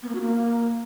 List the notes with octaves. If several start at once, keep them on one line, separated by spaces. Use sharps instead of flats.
B3
A#3
F#4
A#3